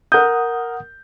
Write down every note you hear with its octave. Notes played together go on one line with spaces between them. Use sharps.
A#4 F#5 D#6 G6